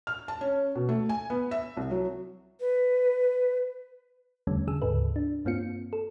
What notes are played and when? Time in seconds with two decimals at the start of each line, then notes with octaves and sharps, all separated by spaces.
0.07 F6
0.28 A5
0.41 C#4
0.75 B2
0.89 A3
1.09 G#5
1.30 B3
1.51 E5
1.77 C2
1.91 F#3
2.60 B4
4.47 E2 D3 G3 A3 C#4
4.67 D3 G#4 E6
4.82 D2 G#2 C#3 A4 B4
5.16 D4
5.45 G2 A#3 C4 F4 C#7
5.93 A4